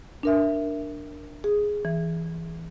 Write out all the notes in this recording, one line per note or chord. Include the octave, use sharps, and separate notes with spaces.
D4 A#4 E5
G#4
E3